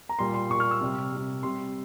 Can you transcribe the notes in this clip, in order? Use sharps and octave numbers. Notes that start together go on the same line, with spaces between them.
A#5
A#2 G3 C6
C6
A#2 C#6
G3
F6
E6
C3 G3
C3 G3
C3 G3 C6